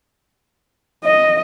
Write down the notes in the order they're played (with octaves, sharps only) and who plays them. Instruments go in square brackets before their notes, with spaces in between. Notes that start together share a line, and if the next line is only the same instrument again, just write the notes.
[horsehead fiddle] D#5